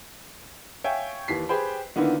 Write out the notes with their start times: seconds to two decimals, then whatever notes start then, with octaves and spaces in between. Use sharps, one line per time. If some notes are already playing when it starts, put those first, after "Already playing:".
0.84 C#5 E5 F5 G5 G#5
1.28 D#2 E3 B6 C7
1.49 G4 G#4 B4 C5 G5 B5
1.96 D3 D#3 A#3 B3 E4 F4